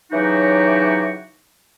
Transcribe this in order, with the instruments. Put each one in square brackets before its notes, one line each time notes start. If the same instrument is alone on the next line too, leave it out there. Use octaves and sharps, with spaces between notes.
[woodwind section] C#3 E3 F#3 D#4 F#4 G4